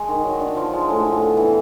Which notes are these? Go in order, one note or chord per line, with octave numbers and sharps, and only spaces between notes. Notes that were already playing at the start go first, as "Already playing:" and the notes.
Already playing: G#3
D#3
F#3
D4
F3
G#3
A2
A2
B3
E3